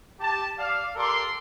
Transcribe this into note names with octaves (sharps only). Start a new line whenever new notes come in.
G4 A5
D5 F5
G4 A4 A#4 D5 C6 D6